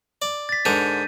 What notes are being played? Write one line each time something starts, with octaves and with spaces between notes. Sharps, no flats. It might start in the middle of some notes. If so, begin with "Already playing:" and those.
D5
A6 B6
G#2 D3 A#4 G6 D#7